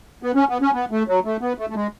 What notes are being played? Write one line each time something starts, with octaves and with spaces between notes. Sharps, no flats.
B3
C#4
B3
C#4
B3
A3
F#3
A3
B3
A3
A3
G#3